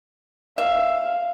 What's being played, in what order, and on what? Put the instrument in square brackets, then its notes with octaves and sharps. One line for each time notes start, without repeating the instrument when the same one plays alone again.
[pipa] E5 [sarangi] F5